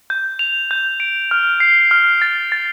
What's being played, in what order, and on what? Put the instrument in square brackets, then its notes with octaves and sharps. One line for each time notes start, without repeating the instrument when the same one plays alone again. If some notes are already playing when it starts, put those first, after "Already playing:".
[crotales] G6
F7
G6
D7
F6
C7
F6
A6
A6